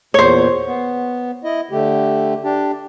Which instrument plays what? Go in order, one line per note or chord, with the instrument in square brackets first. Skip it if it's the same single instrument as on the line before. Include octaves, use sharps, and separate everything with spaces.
[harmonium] E2 A#2 [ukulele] C5 C#5
[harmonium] B3
E4 D#5
D3 A3 G4
D4 G4